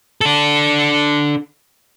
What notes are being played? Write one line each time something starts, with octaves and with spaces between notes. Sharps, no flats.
D4 A4